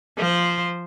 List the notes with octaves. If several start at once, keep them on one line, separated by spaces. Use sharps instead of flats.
F3 C5